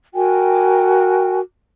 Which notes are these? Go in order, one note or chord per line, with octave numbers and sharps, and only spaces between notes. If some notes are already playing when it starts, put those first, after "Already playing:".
F#4 A#4 G5 G#5